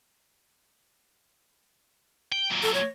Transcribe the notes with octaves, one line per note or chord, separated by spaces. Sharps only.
G5
F#2 A#2
A4
C#5